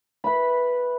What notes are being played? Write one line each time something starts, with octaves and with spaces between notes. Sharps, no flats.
B4 E5 B5